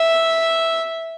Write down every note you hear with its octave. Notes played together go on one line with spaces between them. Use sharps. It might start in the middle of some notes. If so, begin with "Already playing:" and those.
Already playing: E5